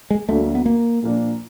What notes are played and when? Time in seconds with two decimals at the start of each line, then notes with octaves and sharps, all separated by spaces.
0.10 G#3
0.29 D2 D3 F#3 A3 A#3 D4
0.55 B3
0.66 A#3
1.02 A#2 F3 A#3 D4